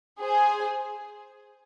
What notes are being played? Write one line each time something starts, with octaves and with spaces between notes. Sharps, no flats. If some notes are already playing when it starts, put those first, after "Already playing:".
G#4 C5 G#5